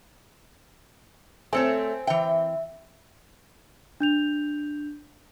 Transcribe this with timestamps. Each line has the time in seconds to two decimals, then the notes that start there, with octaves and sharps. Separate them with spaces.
1.53 A3 C4 A4 C#5 G#5 G6
2.07 E3 E5 G5
4.00 D4 G6 F7